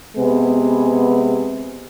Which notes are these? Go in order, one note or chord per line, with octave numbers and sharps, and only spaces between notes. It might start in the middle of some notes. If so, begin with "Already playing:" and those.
C3 G#3 B3